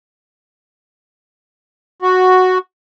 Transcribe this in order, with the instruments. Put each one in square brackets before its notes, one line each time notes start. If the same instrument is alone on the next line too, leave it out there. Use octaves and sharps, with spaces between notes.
[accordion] F#4